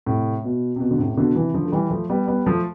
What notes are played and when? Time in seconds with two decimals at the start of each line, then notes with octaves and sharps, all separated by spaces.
0.06 A2 C3
0.44 B2
0.76 C3
0.80 B2
0.91 D3
0.99 A2 C3
1.09 C3
1.17 B2 D3
1.35 C3 E3
1.54 D3 F3
1.65 A3
1.72 E3 G3
1.91 F3 A3
2.10 G3 B3
2.28 G3 B3
2.46 F3 A3